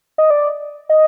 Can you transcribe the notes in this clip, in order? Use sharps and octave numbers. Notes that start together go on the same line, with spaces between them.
D#5
D5
D#5